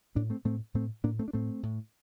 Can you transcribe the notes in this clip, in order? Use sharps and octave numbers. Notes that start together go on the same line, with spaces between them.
A2 A#3 D4
A3 C4
A2 A3 C4
A2 A3 C4
A2 A#3 D4
A3 C4
D4
A2 A3 C4
A2